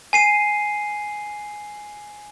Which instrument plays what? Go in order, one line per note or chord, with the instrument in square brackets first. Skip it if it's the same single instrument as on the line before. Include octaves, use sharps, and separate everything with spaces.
[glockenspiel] G#5 C7 D#7